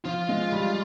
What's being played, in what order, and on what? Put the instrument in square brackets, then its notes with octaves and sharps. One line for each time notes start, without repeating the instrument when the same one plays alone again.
[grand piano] F3 [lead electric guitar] F4
[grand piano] G#3
G3